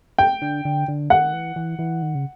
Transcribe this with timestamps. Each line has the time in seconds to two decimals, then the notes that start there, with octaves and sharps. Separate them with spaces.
0.18 G5
0.42 D3
0.65 D3
0.88 D3
1.10 D#3 F#5
1.33 E3
1.56 E3
1.79 E3
2.02 D#3
2.15 C#3